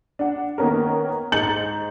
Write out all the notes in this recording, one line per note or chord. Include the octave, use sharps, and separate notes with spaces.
D4 F#5
D#3 A#3 B3 C#4 A#4
G#2 A#5 G6 A6 C#7 F#7